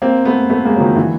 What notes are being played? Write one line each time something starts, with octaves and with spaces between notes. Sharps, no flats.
A#3 C4
A3 B3
A3 B3
G#3 A#3
F#3
D#3 F3
D3 E3